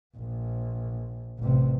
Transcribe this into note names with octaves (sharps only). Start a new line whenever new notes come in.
A#1
A1 C3